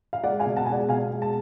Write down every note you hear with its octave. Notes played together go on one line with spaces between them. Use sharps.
F5
G#3 D5 F#5
F5 G#5
B2
F#5 A5
G#3 G#5
D5 F#5
B2 F5 G#5
G#3
A5